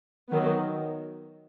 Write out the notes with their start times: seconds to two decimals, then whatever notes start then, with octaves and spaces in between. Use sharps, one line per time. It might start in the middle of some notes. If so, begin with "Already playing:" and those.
0.30 D#3 F#3 B3